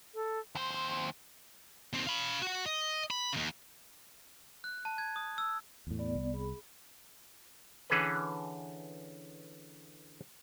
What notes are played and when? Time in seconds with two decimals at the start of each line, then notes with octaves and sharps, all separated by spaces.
0.15 A4
0.55 D#2 C5 C6
1.93 D#2 C4
2.07 F5 B5
2.42 F#4 F#5
2.66 D#5
3.11 B5
3.33 D#2 C#3
4.64 F#6
4.85 A5
4.98 G#6
5.16 D#6
5.38 E6
5.87 E2 A2
5.99 B3 D5
6.15 C2
6.34 G#4 B5
7.90 D3 E3 C#4 G#4 A4 B4